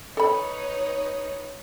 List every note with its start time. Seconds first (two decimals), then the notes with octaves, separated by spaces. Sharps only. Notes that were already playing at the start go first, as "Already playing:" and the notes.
0.17 D#4 A4 B4 C#5 B5